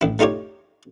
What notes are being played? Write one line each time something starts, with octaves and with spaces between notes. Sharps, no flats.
A1 E4
A3 D#4 F4 G4 C#5